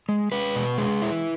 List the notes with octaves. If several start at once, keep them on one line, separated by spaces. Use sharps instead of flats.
G#3
G#3 B4
B2
G#3
E4